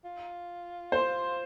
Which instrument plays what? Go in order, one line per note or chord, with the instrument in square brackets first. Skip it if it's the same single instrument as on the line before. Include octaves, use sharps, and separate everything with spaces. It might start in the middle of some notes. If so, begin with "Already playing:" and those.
[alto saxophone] F4
[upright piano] C5